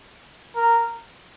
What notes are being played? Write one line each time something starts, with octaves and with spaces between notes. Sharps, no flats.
A#4